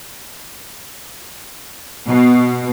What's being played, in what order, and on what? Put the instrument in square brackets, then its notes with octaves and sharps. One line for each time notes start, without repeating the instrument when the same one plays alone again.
[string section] B2